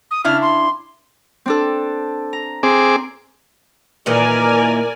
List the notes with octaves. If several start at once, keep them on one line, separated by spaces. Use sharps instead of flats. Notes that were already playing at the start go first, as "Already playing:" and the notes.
D#6
C#3 D4 E4 F6
C6
C4 D4 A4
A#5
C4 G#4 D6
A#2 D#3 E3 A#4 D5 G#5